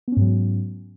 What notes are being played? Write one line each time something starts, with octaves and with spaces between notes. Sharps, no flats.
G#2 F#3 B3 C#4